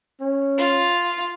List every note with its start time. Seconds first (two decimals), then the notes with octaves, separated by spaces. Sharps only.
0.21 C#4
0.58 F4